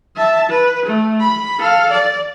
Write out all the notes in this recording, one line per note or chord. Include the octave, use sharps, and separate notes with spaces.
E5 A5
B4
A3
B5
A4 F5
D5